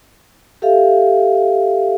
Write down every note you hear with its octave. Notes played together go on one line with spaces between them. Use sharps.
G4 A4 E5 F5